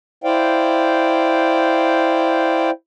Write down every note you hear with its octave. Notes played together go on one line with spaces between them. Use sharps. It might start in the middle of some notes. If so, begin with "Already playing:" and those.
E4 C5 D5 F5 G5